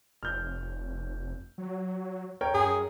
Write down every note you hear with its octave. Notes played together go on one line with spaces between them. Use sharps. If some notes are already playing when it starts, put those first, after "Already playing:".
F1 F6 G6
F#3
A#4 C#5 G5
F#2 G#4